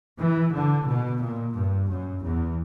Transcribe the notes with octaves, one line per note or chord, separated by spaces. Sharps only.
E3
D3
B2
A#2
G2
F#2
E2